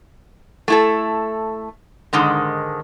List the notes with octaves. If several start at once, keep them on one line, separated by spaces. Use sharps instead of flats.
A3 E4 A4
G#2 D3 D#3 G#3